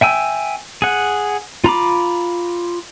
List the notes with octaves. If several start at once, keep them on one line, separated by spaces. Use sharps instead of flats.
E5 G5 G#5 E6
G#4 F#5
F4 A#5 B5 D6